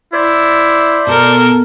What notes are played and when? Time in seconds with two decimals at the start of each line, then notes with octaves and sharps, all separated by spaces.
0.13 E4 C5 D5
1.07 B2 A4 A#4